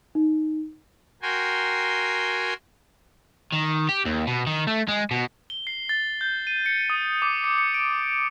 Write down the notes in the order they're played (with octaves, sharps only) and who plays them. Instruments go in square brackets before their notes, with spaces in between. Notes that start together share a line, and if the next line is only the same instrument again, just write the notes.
[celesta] D#4
[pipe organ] F#4 A#4 G5 G#5 C6
[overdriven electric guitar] D#3
G4
D#2
B2
D#3
A3
G#3
B2
[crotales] G7
C7
A6
G6
D#7
C#7
D#6
D6
C#7
C#7
D7